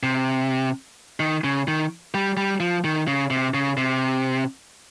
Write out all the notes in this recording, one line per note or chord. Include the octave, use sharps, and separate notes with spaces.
C3
D#3
C#3
D#3
G3
G3
F3
D#3
C#3
C3
C#3
C3